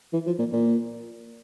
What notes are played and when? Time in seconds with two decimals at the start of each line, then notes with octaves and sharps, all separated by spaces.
0.13 E3
0.26 F3
0.39 A#2
0.52 A#2